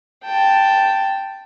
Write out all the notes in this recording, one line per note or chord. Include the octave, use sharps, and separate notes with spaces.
G5 A5